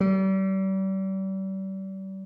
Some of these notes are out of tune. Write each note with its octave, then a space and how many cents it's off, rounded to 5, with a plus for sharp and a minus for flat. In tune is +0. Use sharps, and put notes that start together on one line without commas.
G3 -35